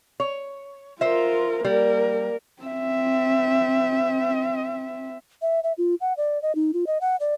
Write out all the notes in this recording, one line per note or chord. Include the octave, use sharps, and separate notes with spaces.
C#5
F4 A#4 C5 E5
G3 A#3 A#4
C4 E5
E5
E5
F4
F#5
D5
D#5
D#4
F4
D#5
F#5
D5